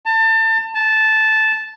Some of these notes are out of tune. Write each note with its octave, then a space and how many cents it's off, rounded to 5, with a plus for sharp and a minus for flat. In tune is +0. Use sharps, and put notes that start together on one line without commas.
A5 +30
A5 -10